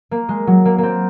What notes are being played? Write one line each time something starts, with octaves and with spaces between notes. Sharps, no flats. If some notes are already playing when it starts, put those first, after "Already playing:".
A#3
G#3
F#3
A#3
A#3 C4